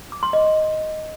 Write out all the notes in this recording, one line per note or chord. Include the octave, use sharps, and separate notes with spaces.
D6
C6
D#5